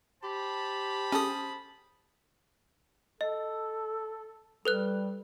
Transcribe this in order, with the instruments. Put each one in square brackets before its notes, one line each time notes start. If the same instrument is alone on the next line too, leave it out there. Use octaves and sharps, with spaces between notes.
[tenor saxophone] G4 [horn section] C5 A5 B5
[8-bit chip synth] C#4 D#6 [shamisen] G#4 A4
[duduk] A4 [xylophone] D#5
[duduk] G3 [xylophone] A4 B4 F#6